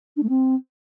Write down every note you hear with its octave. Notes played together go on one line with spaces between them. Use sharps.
D4
A3
C4